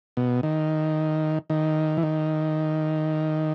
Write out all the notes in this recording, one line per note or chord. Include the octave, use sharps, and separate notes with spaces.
B2
D#3
D#3
E3
D#3